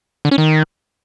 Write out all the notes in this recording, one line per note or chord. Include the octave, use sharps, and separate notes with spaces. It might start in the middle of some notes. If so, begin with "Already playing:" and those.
D3
C#4
D#3